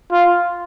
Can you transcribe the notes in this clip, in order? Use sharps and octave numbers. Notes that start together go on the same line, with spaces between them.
F4